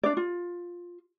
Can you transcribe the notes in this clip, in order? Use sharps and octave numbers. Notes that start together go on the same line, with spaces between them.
D4 D5
F4